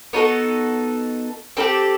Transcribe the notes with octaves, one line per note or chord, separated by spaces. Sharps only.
B3 D#4 F#4 A4
C4 D#4 G4 A4